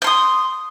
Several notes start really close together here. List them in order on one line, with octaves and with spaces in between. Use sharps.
G6 C6 D#6